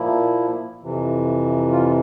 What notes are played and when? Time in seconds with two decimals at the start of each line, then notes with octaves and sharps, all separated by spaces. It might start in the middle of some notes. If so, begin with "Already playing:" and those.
Already playing: A#2 F3 A#3 E4
0.83 F2 C3 E3
1.72 F4